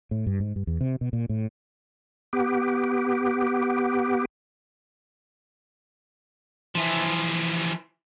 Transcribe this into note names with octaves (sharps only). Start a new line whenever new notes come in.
A2
G2
G#2
G2
E2
C3
B2
A#2
A2
B3 G4
E3 F3